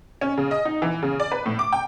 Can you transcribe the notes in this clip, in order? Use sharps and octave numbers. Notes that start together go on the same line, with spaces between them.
C#4
C#3
D#5
D#4
E3
C#3
D5
B4
A2
D6
G5